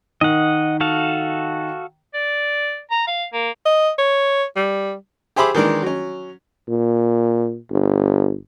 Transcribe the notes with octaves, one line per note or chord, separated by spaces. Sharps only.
D#3 D#5 F#5
F#4 A4 F5
D5
A#5
F5
A#3
D#5
C#5
G3
G4 G#4 C5 E5 B5 D6
D#3 E3 G#3 D4 A#4
F#3 C#4
A#2
G1